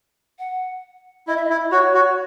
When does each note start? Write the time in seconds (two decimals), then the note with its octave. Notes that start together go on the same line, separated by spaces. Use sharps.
0.39 F#5
1.28 E4 D#5
1.36 E5
1.44 D#5
1.50 E4
1.72 F#4 C#5
1.94 F#4